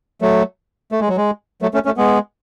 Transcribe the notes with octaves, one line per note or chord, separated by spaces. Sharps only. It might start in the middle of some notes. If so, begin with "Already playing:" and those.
F#3 A3
A3
G#3
F#3
G#3
F#3 A3
A3 C#4
A3 C#4
G#3 B3